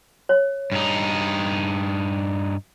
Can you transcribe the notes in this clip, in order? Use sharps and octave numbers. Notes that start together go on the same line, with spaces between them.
C#5
G2 D#4